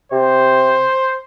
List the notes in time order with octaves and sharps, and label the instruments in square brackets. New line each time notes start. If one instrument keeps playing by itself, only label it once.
[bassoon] C3 [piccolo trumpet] C5